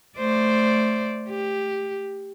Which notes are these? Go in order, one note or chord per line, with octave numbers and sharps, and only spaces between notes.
A3 C5 D5
G4